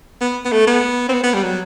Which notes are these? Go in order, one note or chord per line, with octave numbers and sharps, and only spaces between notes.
B3
B3
A3
B3
C4
B3
B3
G3
F#3